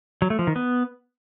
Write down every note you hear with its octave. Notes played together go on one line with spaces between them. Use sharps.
F#3
A3
F3
D#3
B3